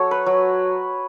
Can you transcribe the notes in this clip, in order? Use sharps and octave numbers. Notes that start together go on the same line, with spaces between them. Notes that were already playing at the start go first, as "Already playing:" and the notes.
Already playing: F#3 F#4 A4 C#5
B4
F#3